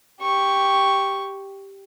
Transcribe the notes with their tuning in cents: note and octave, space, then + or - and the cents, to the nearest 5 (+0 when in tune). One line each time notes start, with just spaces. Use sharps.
G4 +0 C#6 +0